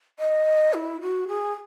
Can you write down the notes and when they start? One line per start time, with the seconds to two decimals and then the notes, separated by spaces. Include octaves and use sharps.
0.19 D#5
0.73 E4
1.01 F#4
1.28 G#4